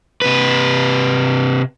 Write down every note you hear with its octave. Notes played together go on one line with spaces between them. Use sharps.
C3 B4